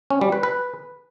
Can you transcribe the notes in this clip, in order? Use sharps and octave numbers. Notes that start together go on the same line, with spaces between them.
C#4
G3
B4
B4